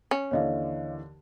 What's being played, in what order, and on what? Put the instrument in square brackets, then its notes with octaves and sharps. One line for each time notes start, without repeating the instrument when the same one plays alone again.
[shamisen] C#4
[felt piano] D#2 D3 E3 [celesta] C#5 D#5 F5